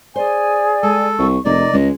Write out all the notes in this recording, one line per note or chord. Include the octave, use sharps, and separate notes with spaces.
G#4 C5 D5 D#5 G#5
G#3 A4
C2 C#6
F1 C3 A#3 D#4 D5 D#5
C#2 G#3